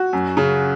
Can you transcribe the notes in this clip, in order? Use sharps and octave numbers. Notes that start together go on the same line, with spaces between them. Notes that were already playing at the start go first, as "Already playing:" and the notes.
Already playing: F#4
F#2
C#3